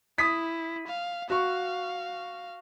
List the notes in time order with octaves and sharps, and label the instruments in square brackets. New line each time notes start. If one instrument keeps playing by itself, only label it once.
[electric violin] E4 [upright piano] D#6 B6
[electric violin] F5
[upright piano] F#4 C#6 [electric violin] F5